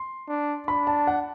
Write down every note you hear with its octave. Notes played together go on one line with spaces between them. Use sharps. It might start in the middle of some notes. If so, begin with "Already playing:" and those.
Already playing: C6
D4
D4 B5
A5
F#5